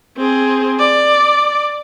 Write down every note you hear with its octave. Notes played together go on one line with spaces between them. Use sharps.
C4 G#4
D5